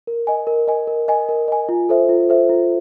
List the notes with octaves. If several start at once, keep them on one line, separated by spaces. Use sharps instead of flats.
A#4
D#5 G#5
A#4
D#5 G#5
A#4
D#5 G#5
A#4
D#5 G#5
F4
A4 C5 E5
F4
A4 C5 E5
F4